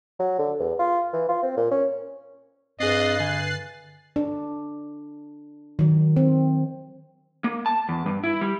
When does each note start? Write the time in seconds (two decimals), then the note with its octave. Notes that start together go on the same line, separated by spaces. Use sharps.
0.19 F#3
0.38 D3
0.60 E2
0.79 F4
1.13 E3
1.29 F4
1.43 C4
1.57 A#2
1.71 C#4
2.80 G2 C4 G#4 D#5 F#6 A6 C7
3.20 D3 G#5
4.16 D4
5.79 D#3 F#3
6.17 C4
7.44 A#3
7.66 A5
7.88 E2
8.06 G2
8.24 E4
8.41 G3